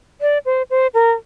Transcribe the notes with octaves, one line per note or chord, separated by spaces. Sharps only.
D5
C5
C5
A#4